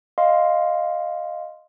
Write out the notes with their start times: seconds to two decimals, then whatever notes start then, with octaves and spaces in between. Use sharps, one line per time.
0.18 D#5 F5 C6